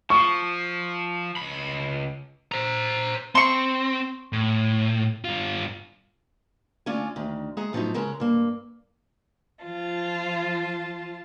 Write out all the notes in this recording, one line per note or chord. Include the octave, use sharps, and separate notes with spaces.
F3 C#6
C#2 B5
C5 A#5
C4 C6 C#6
A2
G2 F4
D3 A3 C#4 F4 D5 G#5
D2 D#3
G#3 G#4 F#5 A#5
A2 F3 F#3 B3 D#4
C#3 G#3 C#4 A#4 F#5
G2 A#3
F3 F4 A5